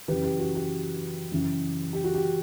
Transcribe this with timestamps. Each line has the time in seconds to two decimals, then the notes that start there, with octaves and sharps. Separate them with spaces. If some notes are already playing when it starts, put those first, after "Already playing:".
0.08 F#2 C#3 E3 G4 B4
0.24 G4
0.39 F#4
0.55 G4
1.32 F#2 C#3 E3
1.93 G4
2.04 F#4
2.15 G4